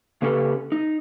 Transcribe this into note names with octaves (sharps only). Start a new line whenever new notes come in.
C#3 A#3 C#4 G4 A4 B4
D#4